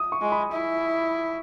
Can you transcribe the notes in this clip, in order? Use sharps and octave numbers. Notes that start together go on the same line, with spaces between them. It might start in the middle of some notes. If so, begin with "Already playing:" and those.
Already playing: D#6
C#6
G#3
B5
E4